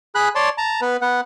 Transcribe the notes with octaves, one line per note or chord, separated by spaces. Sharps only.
G#4 B5 F#6
C#5 D5 A5 C6
A5 A#5
B3 B4
B3 F#5